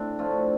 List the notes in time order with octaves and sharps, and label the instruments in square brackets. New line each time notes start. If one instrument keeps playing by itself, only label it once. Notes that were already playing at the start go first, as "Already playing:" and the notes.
Already playing: [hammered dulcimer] A2 C4 D4
D3 F3 A3 F4